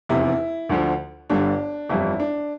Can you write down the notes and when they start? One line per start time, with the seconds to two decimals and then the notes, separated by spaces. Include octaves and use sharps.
0.09 F1 E2 C3 E4
0.69 D2 D3 F3
1.30 G1 G2 D3 G3 D4
1.89 G1 F2 E3 G3 E4
2.19 D4